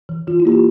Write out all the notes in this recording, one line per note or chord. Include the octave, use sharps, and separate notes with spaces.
E3
E3 F4
E4
A#3 G4
F4